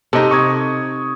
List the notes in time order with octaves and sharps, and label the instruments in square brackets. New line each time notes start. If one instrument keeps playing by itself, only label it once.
[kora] C3 D#4 [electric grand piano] A4 D#5
[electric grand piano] C#6 D#6 G#6